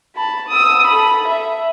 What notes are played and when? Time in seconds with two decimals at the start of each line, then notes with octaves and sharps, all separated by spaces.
0.16 A5 B5
0.49 D#6 E6
0.87 A4 B5
1.28 E5